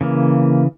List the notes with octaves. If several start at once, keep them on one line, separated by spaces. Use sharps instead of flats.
C#3 E3 A#3